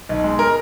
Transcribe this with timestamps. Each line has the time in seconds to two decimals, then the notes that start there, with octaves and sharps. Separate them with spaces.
0.09 B1
0.24 G#3
0.39 A#4